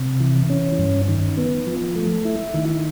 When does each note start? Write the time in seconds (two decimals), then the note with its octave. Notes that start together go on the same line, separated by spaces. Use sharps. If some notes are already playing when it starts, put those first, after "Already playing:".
Already playing: C3
0.20 E3
0.50 C#4
0.79 G2
1.08 D#3
1.37 B3
1.67 F3
1.96 A3
2.25 E4
2.54 D#3